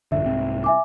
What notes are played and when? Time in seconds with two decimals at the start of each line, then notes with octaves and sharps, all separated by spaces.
0.12 A1 F#2 D3 E5
0.25 C2 G#2 C4
0.64 E5 G#5 D6